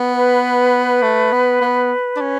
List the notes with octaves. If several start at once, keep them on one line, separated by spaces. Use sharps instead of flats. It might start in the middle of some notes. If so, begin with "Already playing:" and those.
Already playing: B3
B4
A3
B3
B3
D4
C#4